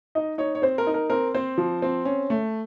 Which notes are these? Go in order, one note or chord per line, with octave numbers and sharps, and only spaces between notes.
D#4 D#5
D#4 C#5
C#5
C4 C5
A#4
D#4
A#4
C4 A#4
C4 C5
F3
C4
C#4
A3